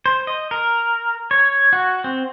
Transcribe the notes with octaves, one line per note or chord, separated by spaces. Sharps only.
C5
D#5
A#4
C#5
F#4
C4